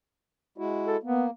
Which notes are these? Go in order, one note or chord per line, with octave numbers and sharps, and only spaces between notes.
G#3 E4 F#4
A4
A#3 B3